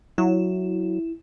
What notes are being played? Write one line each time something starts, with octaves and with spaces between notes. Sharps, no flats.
F#3 E4